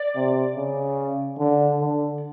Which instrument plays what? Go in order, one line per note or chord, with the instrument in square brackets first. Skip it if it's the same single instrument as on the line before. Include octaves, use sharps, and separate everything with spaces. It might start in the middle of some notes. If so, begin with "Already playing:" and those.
Already playing: [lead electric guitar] D5
[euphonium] C3
C#3
D3
D3